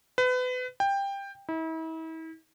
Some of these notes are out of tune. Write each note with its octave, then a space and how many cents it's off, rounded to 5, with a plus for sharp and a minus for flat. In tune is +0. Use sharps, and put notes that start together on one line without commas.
B4 +30
G5 +15
E4 -40